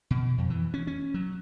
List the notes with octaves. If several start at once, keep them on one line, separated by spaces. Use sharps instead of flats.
B2
F2
E3
C#4
C#4
F#3